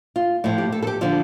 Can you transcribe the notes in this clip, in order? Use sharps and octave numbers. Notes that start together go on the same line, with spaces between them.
F4
A2 F3
G4
A4
A4
G4
D3 F3 F4